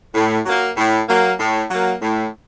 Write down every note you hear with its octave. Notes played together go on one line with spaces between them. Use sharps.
A2
F#3 A#3
A2
F#3 A#3
A2
F#3 A#3
A2